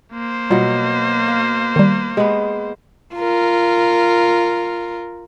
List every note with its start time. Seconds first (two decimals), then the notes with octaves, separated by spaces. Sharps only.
0.13 A#3 C5
0.50 B2 F#3 G3 F4
1.28 F5
1.76 D#3 G3
2.17 G#3 B3 G4
3.15 F4 A#4